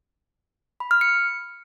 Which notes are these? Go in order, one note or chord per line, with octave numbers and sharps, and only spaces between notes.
B5
F6
C#7